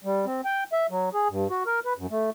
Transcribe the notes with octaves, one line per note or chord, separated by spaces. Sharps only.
G3
C4
G5
E5
F#3
G#4
G2
F#4
A#4
B4
F#2
A3